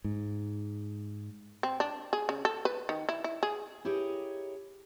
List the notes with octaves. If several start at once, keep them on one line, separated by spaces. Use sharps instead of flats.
G#2
C4
D4
G#4
C#3
A4
B4
D#3
E4
E4
G#4
E4 G4 G#4 A#4 C#5 D#5